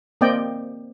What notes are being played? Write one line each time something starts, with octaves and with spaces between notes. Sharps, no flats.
A#3 C4 D5 D#5 G5